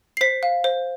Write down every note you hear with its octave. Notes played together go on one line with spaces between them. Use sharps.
C7
C5 B6
F5
C5